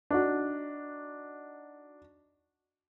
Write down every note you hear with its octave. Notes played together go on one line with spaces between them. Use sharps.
D4 D#4 F#4